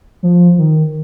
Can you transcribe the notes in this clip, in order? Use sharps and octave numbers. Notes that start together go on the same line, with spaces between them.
F3
D#3